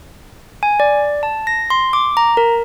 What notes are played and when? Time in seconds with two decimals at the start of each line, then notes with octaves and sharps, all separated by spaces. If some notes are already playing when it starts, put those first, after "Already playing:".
0.63 G#5
0.80 D5
1.23 A5
1.47 A#6
1.70 C6
1.93 D6
2.17 A#5
2.37 A#4